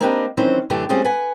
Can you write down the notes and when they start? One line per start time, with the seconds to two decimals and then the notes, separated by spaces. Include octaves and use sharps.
0.01 A#3 C4 D4 D#4 G4 B4
0.37 D#3 E3 F#3 C4 C#4 C5
0.70 F#2 D3 E3 A3 D4 G4
0.89 G3 A3 C4 C#4 F4 G#4
1.04 B4 F#5 G#5